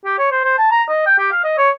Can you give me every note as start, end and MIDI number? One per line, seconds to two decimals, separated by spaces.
0.05 0.18 67
0.18 0.28 73
0.32 0.44 72
0.44 0.54 72
0.58 0.68 81
0.71 0.83 82
0.89 1.02 75
1.06 1.17 79
1.19 1.30 67
1.32 1.40 77
1.44 1.55 75
1.58 1.70 73